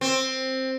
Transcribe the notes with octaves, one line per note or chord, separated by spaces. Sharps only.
C4